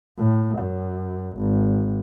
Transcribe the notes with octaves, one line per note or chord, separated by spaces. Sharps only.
A2
F#2
G#1